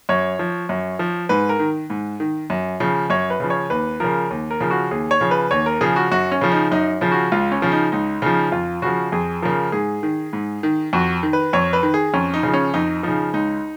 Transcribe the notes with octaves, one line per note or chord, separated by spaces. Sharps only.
F#2 C#5
F3
F#2
F3
G#2 B4
A#4
D#3
G#2
D#3
F#2
C#3 F3
F#2 C#5
B4
C#3 F3
C#5
D#2 B4
C#3 F3 A#4
D#2
A#4
C#3 F3
F#4
D#2 G#4
C#5
C#3 F3
B4
D#2 C#5
A#4
C#3 F3 G#4
F#4
F#2 F#4
C#4
C#3 F3
D#4
F#2 D#4
C#3 F3
F#4
C#2 F4
C#4
C#3 F3
D#4
C#2 D#4
C#3 F3 D#4
F2 F4
C#3 F3 F#4
F2 G#4
C#3 F3 A#4
G#2 G#4
D#3
G#2
D#3
F2 F#4
D#3
B4
F2 C#5
B4
D#3
G#4
F2 C#4
D#4
C#3 F3
C#4
F2 D#4
C#3 F3 D#4
C#2 D#4